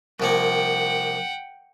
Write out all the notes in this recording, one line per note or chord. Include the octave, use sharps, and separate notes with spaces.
C2 F3 A#3 F#5 G5